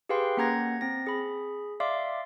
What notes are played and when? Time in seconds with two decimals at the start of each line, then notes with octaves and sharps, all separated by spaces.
0.09 G4 G#4 B4 F5 G5 C6
0.37 A#3 C#4 F#5 A#5 G#6 A#6
0.81 C4 A#6
1.07 G#4 B5
1.80 D5 E5 F5 C6 D6